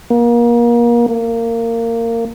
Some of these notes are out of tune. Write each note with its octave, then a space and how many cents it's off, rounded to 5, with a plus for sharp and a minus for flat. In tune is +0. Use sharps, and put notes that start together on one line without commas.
A#3 +30
A#3 -20